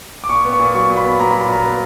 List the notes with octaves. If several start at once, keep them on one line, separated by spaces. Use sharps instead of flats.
D6
A#2 C#6
B3
C#6
A#2
F#3 C#6
A#2
B5
B3
A#2 A#5
B5
F#3
B5
A#2 A#5
B3